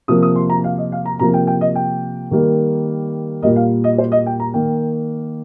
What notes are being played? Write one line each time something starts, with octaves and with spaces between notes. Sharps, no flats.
C3 F3 A#3 D#6
D#6
C6
A#5
F5
D#5
F5
A#5
C3 F3 A#3 A#5
G5
G5
D#5
G5
D#3 G3 A#3
A#2 G3 A#3 D#5
F5
D#5
C5
D#5
G5
A#5
D#3 A#3 G5